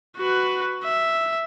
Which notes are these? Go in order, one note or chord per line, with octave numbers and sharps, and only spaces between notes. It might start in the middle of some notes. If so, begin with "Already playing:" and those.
F#4 B4
E5